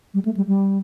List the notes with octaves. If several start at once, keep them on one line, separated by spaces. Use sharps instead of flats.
G3
A3
G3
G3